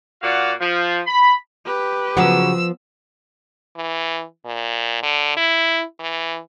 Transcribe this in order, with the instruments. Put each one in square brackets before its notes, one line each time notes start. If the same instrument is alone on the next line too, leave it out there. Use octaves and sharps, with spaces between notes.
[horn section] A#2 F#4 D5 F5 F#5
F3
B5
[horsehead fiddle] G4 B4
[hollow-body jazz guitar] C#3 F#3 [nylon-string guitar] F3 B3 [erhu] E6
[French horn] E3
A#2
D3
E4
E3